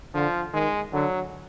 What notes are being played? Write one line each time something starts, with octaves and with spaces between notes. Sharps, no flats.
D3 F3
D#3 G#3
D3 F#3